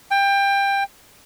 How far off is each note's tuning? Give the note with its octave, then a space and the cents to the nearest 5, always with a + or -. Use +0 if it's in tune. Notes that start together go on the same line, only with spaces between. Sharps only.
G5 +20